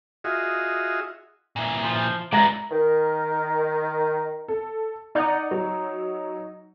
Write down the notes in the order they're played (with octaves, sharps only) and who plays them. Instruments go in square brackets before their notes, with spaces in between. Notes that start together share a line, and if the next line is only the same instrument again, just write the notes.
[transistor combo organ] F4 F#4 G#4 D#5 E5
[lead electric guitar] A#2 E3
[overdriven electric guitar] F3
[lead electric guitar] F#3 E4 [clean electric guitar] G#3 [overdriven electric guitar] B3 D5 [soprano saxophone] A#5
[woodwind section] D#3 A#4
[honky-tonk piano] A4
[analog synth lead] D#4 [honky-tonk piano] D5 F#5
[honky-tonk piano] F#3